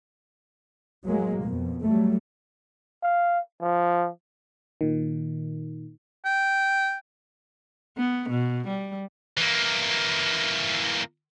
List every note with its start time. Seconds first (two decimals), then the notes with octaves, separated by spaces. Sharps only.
1.06 F#3 G#3 A#3
1.43 F2 B2
1.83 F#3 G3 A3
3.03 F5
3.61 F3
4.81 A#2 D#3
6.25 G5
7.97 B3
8.30 B2
8.67 G3
9.37 E3 A#3